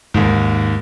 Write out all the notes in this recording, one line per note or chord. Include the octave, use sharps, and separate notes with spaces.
D#2 G#2